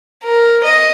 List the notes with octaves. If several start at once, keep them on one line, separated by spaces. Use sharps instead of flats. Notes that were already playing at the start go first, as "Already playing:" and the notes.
A#4
D#5